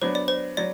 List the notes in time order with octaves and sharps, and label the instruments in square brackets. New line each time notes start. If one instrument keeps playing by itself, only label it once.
[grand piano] F#3 B3 D4 [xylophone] C5
[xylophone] D5
C5
[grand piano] F#3 [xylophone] D5